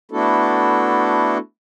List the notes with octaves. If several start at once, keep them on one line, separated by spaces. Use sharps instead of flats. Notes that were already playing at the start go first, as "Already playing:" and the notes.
A3 B3 D4 E4 F#4 A4